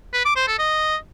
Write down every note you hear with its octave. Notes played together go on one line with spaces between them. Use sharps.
B4
D6
C5
A4
D#5